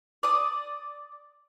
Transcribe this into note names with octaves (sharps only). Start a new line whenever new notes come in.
D5 D#6